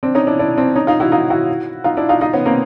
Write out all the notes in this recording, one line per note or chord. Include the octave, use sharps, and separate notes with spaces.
C4 D4
C#4 D#4
D4 E4
D4 E4
C4 D4
C#4 D#4
D#4 F4
E4 F#4
D#4 F4
E4 F#4
D#4 F4
D4 E4
D#4 F4
D#4 F4
B3 C#4
A#3 C4